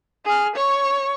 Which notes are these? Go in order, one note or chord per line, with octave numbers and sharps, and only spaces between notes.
G#4 F6
C#5 C#6